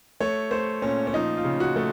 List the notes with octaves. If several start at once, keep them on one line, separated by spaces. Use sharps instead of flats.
A3 C#5
A3 C5
A#2 C#4
C#4
F3 D#4
F4
C#3
F#4
A3